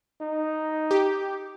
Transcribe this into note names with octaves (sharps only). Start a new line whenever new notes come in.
D#4
G4